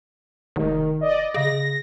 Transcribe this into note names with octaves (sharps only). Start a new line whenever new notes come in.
F1 D#3
D5 D#5
C#3 A#6